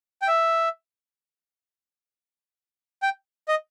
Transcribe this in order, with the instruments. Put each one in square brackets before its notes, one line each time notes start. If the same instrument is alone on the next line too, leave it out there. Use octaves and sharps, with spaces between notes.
[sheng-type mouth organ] G5
E5
G5
D#5